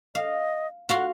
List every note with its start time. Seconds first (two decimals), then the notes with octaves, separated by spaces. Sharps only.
0.15 D#5 F5
0.89 F4 F#4 F5 F#5